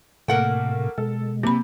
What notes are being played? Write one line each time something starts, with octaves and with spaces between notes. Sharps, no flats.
A2 C3 A3 A#3 A#4 F#5 G5
B2 G#3 A4
C3 A#3 B5